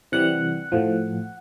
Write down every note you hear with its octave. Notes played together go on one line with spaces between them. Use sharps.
C3 E3 G3 F#5
A2 F3